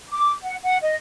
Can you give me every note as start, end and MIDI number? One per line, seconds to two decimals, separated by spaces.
0.10 0.32 86
0.42 0.55 78
0.63 0.78 78
0.82 0.95 75